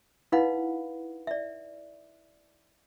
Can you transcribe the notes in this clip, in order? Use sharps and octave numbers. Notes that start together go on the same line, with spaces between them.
D#4 E4 B4 F5 F#5 B5
D5 E5